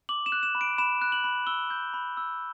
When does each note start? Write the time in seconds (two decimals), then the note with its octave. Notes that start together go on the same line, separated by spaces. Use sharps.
0.09 D6 F#7
0.26 E7
0.32 F#6
0.43 E7
0.55 B5
0.61 D7
0.78 B5 E7
1.02 F#6
1.12 F#7
1.24 B5
1.47 E6 G7
1.70 G6
1.94 B5
2.17 E6